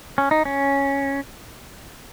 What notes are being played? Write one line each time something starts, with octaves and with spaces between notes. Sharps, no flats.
C#4
D#4
C#4